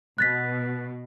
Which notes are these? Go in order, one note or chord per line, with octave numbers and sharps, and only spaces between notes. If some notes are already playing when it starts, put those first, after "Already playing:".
B2 F#6 A6 B6